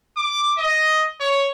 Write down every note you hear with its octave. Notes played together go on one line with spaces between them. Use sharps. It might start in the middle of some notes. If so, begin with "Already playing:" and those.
D6
D#5
C#5